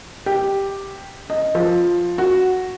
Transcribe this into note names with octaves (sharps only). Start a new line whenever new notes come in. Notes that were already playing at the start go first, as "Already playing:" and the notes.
G4
D#5
F3
F#4